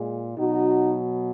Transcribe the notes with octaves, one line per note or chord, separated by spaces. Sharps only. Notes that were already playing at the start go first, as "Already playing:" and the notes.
Already playing: A#2 G#3
B2 F#3 D#4 F#4